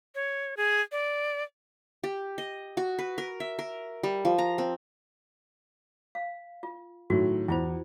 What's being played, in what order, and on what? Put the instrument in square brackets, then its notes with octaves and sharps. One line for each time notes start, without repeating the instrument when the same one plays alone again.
[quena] C#5
G#4
D5
[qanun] G4
D#5
F#4
B4
A#4
E5
A#4
G3
F3
A#5
C4
[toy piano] F5
F4
[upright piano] A2 D#3 F#3 [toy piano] F#4
[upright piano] E2 [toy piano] E4 F4 C5